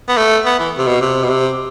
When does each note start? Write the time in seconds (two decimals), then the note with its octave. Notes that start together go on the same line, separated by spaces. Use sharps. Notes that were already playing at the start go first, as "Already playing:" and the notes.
0.08 B3
0.17 A3
0.45 B3
0.59 E3
0.78 C3
0.87 B2
1.01 C3
1.23 B2
1.30 C3